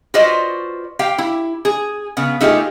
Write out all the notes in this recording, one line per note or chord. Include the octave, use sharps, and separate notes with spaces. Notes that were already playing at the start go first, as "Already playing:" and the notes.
F4 F#4 B4 C5 D5 D#5
G4 F5 G5
E4
G#4
C#3 B3
A3 D#4 F4 G4 G#4